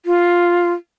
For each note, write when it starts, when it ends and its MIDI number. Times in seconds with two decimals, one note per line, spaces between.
0.06 0.73 65